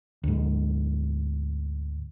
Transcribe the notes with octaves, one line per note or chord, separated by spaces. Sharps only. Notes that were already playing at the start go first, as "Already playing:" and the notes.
D2 G#2